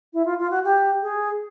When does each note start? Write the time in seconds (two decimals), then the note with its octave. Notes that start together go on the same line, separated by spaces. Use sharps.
0.13 E4
0.25 F4
0.38 F4
0.50 F#4
0.64 G4
1.02 G#4